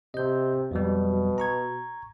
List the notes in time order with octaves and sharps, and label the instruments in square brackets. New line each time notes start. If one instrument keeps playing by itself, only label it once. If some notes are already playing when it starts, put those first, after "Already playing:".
[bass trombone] C3 [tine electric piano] D#5 G6
[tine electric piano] F2 F#3 G3 [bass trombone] B2
[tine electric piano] A#5 C#6 G#6